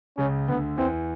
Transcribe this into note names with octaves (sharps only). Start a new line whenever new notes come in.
C#2 C#3 C#4
D2 D3 B3
E2 E3 C4